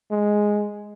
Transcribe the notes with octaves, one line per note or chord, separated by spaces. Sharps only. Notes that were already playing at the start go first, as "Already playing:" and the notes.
G#3